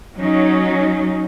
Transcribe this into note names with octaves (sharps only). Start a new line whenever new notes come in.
F#3 C#4 D#4